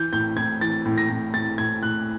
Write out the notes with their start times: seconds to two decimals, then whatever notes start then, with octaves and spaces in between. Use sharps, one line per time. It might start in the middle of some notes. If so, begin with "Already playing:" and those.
Already playing: E3 G6
0.13 A2 G6
0.37 A2 G#6
0.61 E3 A6
0.86 A2
0.98 A#6
1.10 A2
1.34 A2 A6
1.58 A2 G#6
1.83 A2 F#6